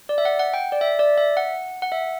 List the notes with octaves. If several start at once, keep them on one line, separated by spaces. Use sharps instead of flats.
D5
E5
F#5
F#5
G5
D5
E5
D5
E5
F#5
F#5
E5